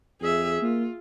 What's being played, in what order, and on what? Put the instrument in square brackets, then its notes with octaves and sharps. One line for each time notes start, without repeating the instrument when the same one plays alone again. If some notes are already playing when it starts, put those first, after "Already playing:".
[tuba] F2 [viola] G#4 E5
[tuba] A#3 [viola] F4